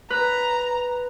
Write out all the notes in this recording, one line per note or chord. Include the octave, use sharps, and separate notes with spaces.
B4 A#5